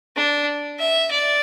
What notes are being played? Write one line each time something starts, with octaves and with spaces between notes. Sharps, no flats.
D4
E5
D5